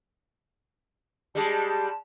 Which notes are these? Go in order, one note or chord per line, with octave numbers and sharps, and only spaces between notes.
G3 G#3 G4 A5